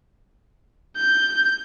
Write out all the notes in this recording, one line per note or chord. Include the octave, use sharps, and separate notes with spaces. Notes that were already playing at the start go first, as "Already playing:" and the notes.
G6